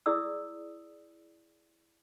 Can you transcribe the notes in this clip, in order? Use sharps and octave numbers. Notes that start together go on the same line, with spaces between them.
E4 G#4 D5 D#6 E6